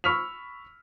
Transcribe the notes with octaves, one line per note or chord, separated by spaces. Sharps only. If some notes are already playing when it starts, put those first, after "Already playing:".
B5 C#6 E6 F6 B6 F7